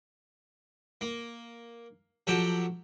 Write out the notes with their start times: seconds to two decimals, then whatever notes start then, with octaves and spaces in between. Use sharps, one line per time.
1.01 A#3
2.27 F3 F#3 F#4 G4 A4